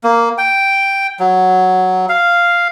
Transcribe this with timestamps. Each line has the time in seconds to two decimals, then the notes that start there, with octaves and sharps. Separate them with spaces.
0.04 A#3
0.38 G5
1.20 F#3
2.09 F5